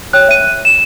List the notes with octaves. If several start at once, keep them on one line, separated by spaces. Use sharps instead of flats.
C#5 G5 F#6
E5 D#7
E7